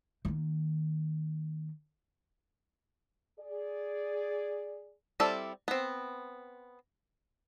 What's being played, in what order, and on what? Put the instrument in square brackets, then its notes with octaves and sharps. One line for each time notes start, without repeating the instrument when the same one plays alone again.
[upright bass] D#3 A#3
[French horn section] G#4 D5
[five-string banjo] G3 C4 E4 A4 D5
B3 C4